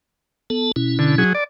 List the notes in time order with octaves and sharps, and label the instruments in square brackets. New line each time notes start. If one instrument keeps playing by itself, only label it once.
[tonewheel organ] B3 A4 A5
B2 C#4 E4
[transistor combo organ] D3
F#3 G#4
D5